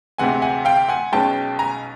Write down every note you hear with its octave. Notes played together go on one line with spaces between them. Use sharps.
D2 C3 E3 G#3 C4 F#5 G#5
F#5 G#5
F5 G5
F#5 G#5
B1 B2 G#3 C#4 G5 A5
G#5 A#5